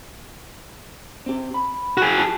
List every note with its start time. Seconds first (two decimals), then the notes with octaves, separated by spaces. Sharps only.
1.26 C4 G4
1.54 B5
1.98 F#4 G#4
2.18 F4 A5